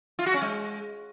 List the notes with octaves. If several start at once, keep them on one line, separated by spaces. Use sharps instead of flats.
F4
F#4
C#4
G#3